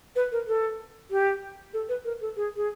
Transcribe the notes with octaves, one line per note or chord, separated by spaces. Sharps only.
B4
A#4
A4
G4
A4
B4
A#4
A4
G#4
G#4